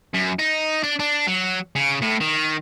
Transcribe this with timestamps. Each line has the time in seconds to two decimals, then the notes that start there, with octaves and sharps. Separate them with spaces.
0.14 F#2
0.39 D#4
0.83 D4
0.99 D4
1.27 F#3
1.76 C#3
2.02 A2
2.21 D#3